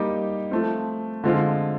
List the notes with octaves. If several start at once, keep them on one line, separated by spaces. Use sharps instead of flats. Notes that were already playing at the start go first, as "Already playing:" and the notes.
Already playing: G3 A#3 D#4 G4
F3 A3 C4
D3 F3 G#3 C4 F4